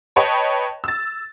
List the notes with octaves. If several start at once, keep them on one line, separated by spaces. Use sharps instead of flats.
B4 C#5 D#5 G5 A5
E6 A6